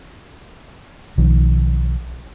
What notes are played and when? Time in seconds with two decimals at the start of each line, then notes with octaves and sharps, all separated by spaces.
1.18 B1 D#3 F3